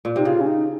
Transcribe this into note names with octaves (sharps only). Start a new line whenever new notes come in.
A#2
C3 D#4
C#3 F4
C#4
D#4